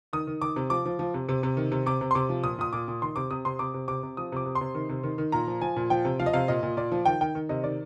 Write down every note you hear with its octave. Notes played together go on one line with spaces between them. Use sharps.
D#3 D#6
D#3
D#3 D6
C3
F3 D6
F3
F3
C3
C3
C3
D#3
C3
C3 D6
C3
C6
C3 D6
F3
A#2 D#6
A#2 D#6
A#2 D6
A#2
D#3 C6
C3 D6
C3 D#6
C3 C6
C3 D6
C3
C3 D6
C3
F3 D#6
C3 D6
C3
C6
C3
D#3
C3
D#3
D#3
A#2 A#5
F3
F3 G#5
A#2
F3 G5
C3
F3 F5
D#5
C3 F5
A#2 D#5
A#2
A#2 D5
F3
D#3 G5
D#3 G5
D#3
C3 D#5
D#3 D5